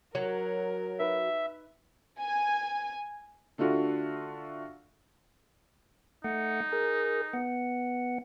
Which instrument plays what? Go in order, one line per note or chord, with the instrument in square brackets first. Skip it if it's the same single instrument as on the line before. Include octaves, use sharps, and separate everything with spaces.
[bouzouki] F#3 [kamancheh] A#4
[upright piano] D#4 B4 [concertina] E5
[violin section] G#5
[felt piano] D3 A3 D4 F4 F#4
[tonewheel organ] A3 F#5 [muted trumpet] D#4
[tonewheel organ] G#4 A#4
B3 F#5